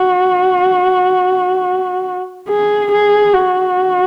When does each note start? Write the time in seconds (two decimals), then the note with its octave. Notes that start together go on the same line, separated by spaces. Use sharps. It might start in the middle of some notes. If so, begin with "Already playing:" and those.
Already playing: F#4
2.49 G#4
2.92 G#4
3.34 F#4